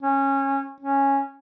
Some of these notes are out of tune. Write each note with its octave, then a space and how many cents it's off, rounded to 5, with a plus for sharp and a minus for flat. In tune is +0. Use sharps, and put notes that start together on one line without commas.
C#4 -20
C#4 -10